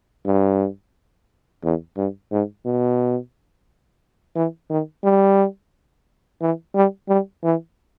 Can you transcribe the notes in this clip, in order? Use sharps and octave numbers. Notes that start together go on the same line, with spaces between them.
G2
E2
G2
G#2
B2
E3
D#3
G3
E3
G3
G3
E3